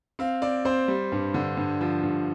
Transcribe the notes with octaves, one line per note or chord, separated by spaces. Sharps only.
C4 F5
C4 D5
C4 C5
G3
G2
D3
G2
F3
G2